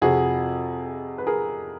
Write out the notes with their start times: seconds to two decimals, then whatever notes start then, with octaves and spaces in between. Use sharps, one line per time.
0.02 F2 C3 F3 F#4 G#4
1.18 B4
1.27 G#4 A#4